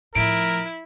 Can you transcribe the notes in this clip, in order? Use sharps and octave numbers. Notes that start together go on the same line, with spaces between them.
A2 F3 E4 A#4 D7